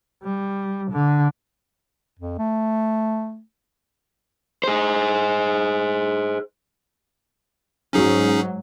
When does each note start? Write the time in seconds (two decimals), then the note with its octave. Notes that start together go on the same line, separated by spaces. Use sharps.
0.23 G3
0.91 D3
2.19 F2
2.39 A3
4.64 G#4 C5
7.93 G#2 F#3 C#4 D#4 G#4